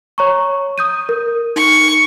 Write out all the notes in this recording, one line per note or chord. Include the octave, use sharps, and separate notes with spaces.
C#5 A#5 C#6
D#6 G6 D#7
A#4
D#4 C#6